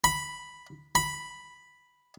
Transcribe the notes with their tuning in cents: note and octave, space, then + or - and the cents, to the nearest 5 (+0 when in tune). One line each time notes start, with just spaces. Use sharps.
B5 +0
B5 +0